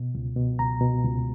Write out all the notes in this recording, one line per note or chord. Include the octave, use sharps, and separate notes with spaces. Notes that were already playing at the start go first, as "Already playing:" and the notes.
Already playing: B2
C#2
B2
C#2 A#5
B2
C#2